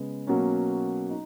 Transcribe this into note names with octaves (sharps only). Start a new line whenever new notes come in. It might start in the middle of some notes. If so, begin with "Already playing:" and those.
Already playing: C#3 G#3 B3
B2 F#3 A#3 C#4
D#4